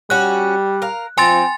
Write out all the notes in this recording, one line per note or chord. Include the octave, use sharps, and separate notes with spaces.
G3 C#4 F#4 F#6
A#4 F5
F3 C4 G#5 C6 A6